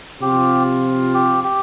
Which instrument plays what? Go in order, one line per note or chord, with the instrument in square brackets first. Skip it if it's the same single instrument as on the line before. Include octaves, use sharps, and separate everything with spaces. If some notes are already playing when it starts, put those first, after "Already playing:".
[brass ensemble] C3 F3 C4 F4 [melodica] G4
[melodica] G4
G4